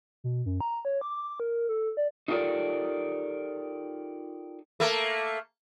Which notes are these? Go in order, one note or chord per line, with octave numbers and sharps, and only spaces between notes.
B2
F#2
A#5
C#5
D6
A#4
A4
D5
D#4 F4 G4 A4 A#4 D5
A3 A#3